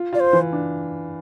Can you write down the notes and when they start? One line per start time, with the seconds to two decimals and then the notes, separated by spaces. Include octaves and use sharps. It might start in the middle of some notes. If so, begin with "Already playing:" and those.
Already playing: F4
0.13 F4 D5
0.20 C5
0.33 E3
0.53 D4